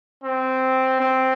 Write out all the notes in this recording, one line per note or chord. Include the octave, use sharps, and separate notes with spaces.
C4
C4